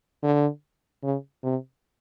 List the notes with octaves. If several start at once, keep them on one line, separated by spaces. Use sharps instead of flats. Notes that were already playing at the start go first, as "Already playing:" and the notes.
D3
C#3
C3